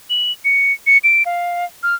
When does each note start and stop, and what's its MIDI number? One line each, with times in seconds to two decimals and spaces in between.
0.10 0.32 102
0.45 0.72 97
0.87 0.98 97
1.04 1.23 98
1.26 1.65 77
1.83 1.95 89